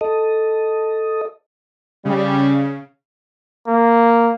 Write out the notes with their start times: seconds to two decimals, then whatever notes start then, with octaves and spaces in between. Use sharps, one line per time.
0.01 A4 D#5
2.05 C#3 G3
3.67 A#3